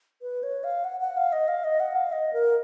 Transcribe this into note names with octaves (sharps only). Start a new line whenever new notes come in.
B4
C#5
F5
F#5
F#5
F5
D#5
F5
D#5
F#5
F5
D#5
A#4